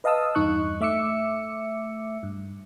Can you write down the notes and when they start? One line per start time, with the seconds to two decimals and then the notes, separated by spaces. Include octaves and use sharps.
0.04 B4 D#5 F5 A5 D#6 E6
0.35 E2 G2 D#4 C#6 F#6
0.81 A3 E5 D6 E6 C#7
2.23 G2